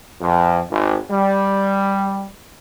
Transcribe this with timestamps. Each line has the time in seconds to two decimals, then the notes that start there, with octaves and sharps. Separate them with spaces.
0.19 F2
0.69 G#1
1.10 G3